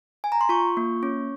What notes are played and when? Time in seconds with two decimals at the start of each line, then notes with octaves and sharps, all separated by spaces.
0.24 G#5
0.32 A#5
0.41 C6
0.49 F4 C#6
0.77 A#3
1.03 C#4